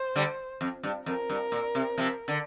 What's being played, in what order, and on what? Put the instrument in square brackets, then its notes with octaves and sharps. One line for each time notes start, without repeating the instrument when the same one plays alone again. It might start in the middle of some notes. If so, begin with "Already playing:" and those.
Already playing: [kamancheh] C5
[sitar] D3 G3
F2
G2
[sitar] F2 [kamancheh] A#4
[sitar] G2
A#2
C3
C3 F3
D3